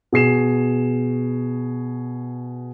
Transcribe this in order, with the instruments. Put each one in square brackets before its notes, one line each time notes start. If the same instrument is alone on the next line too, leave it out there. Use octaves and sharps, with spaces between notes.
[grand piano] B2 G#4 C7 E7